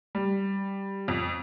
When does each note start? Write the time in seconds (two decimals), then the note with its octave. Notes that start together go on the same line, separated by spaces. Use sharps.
0.15 G3
1.08 F2